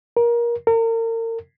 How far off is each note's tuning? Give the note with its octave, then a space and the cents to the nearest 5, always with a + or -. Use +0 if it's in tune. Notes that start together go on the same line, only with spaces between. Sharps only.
A#4 +20
A#4 -40